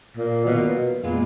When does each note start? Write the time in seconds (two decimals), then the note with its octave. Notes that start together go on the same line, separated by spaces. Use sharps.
0.17 A#2
0.45 B2 D#3 F#3 A#3 F4 A#4
1.03 A#2 G#3 B3 F4 G#4